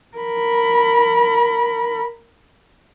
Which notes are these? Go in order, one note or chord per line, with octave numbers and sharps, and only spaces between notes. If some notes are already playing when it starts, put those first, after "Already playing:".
A#4 B5